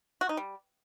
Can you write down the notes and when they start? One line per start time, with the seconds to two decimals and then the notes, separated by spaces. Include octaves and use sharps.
0.21 F#4
0.29 D#4
0.37 G3